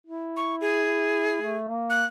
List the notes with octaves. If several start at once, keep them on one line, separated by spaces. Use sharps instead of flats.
E4
C#6
G#4
A3
A#3
F#6